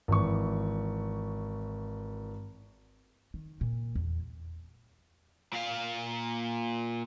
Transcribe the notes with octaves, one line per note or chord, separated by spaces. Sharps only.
G#1 E3 C#6
D#3
A#2
E2
A#2 F5